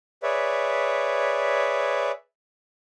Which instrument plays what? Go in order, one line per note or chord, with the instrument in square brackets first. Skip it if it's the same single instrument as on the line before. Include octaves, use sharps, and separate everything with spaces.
[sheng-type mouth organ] G#4 B4 C#5 D5 E5